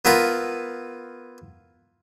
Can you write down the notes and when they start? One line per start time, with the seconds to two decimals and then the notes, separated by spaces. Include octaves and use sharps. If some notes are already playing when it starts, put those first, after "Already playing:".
0.05 B3 E4 F4 A#4 B4